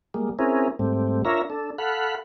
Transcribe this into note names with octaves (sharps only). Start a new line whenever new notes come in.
G3 G#3 A#3
C4 C#4 E4 G#4 A#4
G#2 G3 A3 C4
D4 F4 A#4 C#5 E5 A#5
D4 A4
A4 F5 F#5 B5